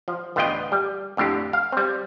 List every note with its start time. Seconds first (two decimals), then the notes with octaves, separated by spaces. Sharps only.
0.08 F3
0.36 A1 D2 B3 F4 D#5 G5
0.72 G3
1.17 F2 A2 D3 G4
1.53 F5
1.72 G3 C4